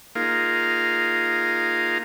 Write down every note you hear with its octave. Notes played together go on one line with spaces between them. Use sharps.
A#3 D#4 F4 G#4 A#4 F5